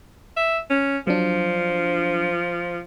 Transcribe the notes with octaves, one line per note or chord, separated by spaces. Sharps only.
E5
C#4
F3 F#3 D4